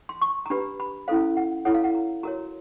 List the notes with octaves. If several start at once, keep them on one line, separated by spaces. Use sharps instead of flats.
C6
C#6
A#5
D4 G4 B4 B5
B5
C#4 E4 A4 C5 F5
F#5
E4 A4 C#5 F#5
F5
F#5
A#5
F#4 A#4 C#5 A#5